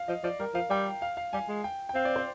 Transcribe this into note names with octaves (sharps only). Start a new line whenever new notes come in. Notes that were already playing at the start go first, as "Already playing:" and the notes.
Already playing: F5
F3 D#5
F3 D5
G3 A#4
F3 F5
G3 G5
F5
F5
G3 G#5
G#3
G5
G5
C4 F5
D5
C5